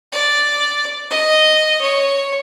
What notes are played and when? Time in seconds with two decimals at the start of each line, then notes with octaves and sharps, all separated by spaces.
0.12 D5
1.10 D#5
1.81 C#5